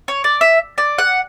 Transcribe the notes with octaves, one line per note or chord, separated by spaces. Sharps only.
C#5
D5
E5
D5
F#5